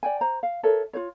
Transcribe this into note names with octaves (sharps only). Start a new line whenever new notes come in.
D5 G5 G#5
C5 A#5
F5
A4 A#4 C#5 E5
F4 C5 C#5